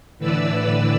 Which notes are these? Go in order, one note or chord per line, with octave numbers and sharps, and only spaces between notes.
A2 D3 E3 B4 D5 E6